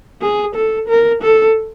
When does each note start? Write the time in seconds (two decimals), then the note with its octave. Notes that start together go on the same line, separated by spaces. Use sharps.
0.21 G#4
0.55 A4
0.88 A#4
1.22 A4